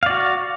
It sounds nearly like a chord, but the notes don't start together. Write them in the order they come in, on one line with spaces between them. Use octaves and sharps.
F5 D5 F#4